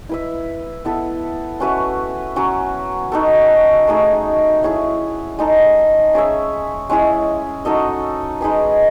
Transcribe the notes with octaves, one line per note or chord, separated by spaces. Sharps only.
E4 B4 E5
B3 E4 A4
C#4 F#4 B4 E5
F#3 C#4 F#4
D#4 F#4 A4
A3 D#4 G#4
E4 G#4 C#5 E5
G#3 D#4 A4
C#4 G#4 C#5 E5
G#3 C#4 E4 G#4
D#4 F#4 A4 D#5
G#3 D#4 G#4 B4